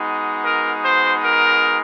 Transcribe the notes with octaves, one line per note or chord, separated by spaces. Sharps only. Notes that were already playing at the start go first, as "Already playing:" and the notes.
Already playing: G#3 B3 D#4 F#4
A#4
C5
A#4